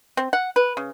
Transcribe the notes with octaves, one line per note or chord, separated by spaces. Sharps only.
C4
F#5
B4
C#3